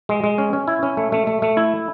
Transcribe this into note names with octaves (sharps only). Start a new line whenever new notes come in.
G#3
G#3
C#4
C#4
E4
C#4
A3
A3
A3
A3
E4